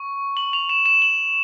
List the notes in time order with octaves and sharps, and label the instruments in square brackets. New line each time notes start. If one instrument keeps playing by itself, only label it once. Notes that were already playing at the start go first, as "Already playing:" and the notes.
Already playing: [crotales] C#6
F#7
F7
E7
E7
F#7